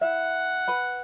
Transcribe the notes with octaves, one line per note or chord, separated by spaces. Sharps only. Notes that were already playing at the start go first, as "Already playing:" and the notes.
E4 E5 F#5
B4 B5